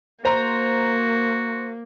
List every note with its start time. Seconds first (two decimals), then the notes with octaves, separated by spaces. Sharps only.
0.25 A#3 F#4 C5 A#5